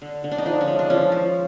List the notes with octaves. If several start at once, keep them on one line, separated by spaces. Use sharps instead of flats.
D3
D3
D4
D#4
F3 D4
C#4
G#3
D4
F3 C#4
F3